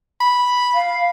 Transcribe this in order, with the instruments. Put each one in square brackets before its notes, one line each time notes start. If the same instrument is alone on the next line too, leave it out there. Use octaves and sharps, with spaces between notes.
[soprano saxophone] B5
[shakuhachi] F5